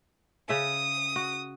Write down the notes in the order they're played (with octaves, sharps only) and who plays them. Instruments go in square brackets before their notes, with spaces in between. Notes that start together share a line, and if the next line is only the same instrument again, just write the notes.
[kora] C#3 E5 [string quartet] D#6
[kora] F#4